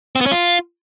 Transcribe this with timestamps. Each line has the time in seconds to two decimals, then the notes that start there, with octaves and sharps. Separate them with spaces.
0.16 C4
0.21 B3
0.26 C#4
0.32 F4